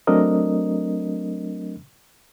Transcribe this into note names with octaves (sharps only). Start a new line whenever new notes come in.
F#3 A3 C4 D4 A#4 D#5